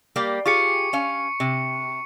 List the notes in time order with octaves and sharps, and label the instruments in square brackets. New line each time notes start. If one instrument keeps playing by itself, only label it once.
[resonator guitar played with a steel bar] G3 A#3 G4
[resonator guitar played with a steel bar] F4 G4 G#4 [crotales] C#6 C#7
[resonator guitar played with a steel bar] C#4 F5
C3